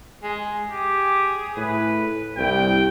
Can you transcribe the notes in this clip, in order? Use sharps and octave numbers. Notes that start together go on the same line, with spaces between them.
G#3
G4 G#4
A2 B4
C2 G2 G5